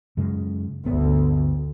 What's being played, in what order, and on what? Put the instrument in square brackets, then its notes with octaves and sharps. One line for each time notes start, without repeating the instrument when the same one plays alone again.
[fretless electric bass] F#2 C#3 G#3
[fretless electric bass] G1 B3 [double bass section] D2